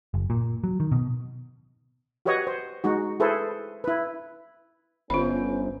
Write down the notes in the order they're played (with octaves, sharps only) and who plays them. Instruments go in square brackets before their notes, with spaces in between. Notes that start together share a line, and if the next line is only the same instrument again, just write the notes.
[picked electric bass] F#1
A#2
F#3
D#3
B2
[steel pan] F#4 G4 B4 C#5 D#5 F#5
C5
G#3 D#4 F#4
E4 G#4 A4 B4 C5
E4 B4
[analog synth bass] G1 [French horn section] B3 C#4 [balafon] F4 B5 [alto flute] C5